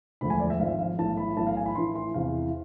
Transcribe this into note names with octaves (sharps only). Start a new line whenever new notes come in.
E1 D2 D3 F3 B5
G#5
D5
E5
G#1 G#2 F3 F5
F5
B1 A2 E3 A5
B5
B1 A2 E3 A5
F5
G#5
B5
A1 A2 E3 C6
C6
E2 C3 E3 F5